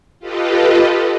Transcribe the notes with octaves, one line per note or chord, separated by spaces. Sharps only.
F4 G4 A4 B4 D#5